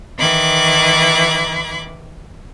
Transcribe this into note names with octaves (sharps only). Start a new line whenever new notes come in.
D#3 E3 B5 D6 F#6 G#6